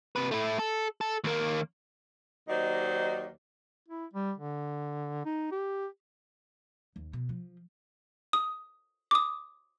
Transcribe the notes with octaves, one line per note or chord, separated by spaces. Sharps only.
C3 B4
A3 E4
A4
A4
D#2 A#3
D#2 F#3 D#4 C5 D5 D#5
E4
G3
D3
D#4
G4
D#2
B2
F3
D#6
D6 D#6